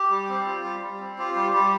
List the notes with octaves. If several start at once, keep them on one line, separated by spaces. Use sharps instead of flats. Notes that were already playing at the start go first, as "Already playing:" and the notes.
Already playing: G4
G3
C4
F4
G3
G3
C4
F4 G4
G3 G4
G3 G4